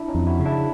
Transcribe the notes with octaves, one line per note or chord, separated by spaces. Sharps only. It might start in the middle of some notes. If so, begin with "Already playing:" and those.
Already playing: D4 E4
C#4 D#4
F2
E4 F#4
C#3
D4 E4